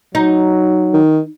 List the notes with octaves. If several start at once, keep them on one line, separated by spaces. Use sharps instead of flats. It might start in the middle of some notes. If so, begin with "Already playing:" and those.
F#3 D#4
D#3